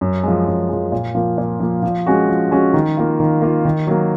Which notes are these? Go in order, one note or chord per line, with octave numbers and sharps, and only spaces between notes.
F#2
F3 G#3
F#2
F3 G#3
A#2
F3 A#3
A#2
F3 A#3
F3
G#3 C#4 F#4
F3
G#3 C#4 F#4
D#3
A#3 F4
D#3
A#3 F4
D#3
F#3 A#3